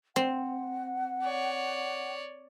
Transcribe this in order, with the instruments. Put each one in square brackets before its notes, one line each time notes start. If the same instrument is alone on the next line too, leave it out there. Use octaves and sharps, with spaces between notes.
[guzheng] C4 [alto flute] F#5
[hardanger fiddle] C#5 D5